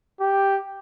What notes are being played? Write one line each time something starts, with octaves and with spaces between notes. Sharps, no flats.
G4